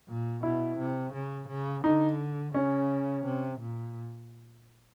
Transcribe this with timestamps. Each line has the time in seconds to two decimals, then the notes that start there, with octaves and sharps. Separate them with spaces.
0.08 A#2
0.43 B2 E4
0.78 C3
1.13 C#3
1.48 C#3
1.84 D3 D#4
2.54 C#3 C#4
3.25 C3
3.60 A#2